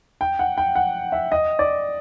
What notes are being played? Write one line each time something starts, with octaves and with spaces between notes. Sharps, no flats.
G5
F#5
G5
F#5
E5
D#5
D5